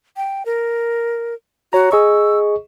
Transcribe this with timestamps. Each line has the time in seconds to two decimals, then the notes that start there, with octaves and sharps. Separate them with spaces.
0.17 G5
0.46 A#4
1.73 F#4 C#5 A#5
1.92 G#4 D#5 C#6 E6